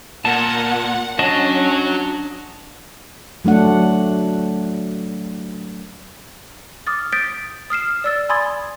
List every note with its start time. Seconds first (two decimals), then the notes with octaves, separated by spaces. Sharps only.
0.25 A#2 A#4 F#5 A5
1.19 C#4 D4 F#4 C#5 D#5 A5
3.45 F#3 A3 D4 F#5
6.87 D6 D#6 F6 A6
7.12 D#6 G6 A6 B6 D7
7.70 D#6 F6 C7 E7
8.04 D5 E6 A6
8.29 G#5 B5 C6 D#6 G#6 A6